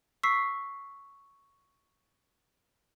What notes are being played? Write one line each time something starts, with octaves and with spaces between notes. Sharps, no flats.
C#6 E6 B6 C7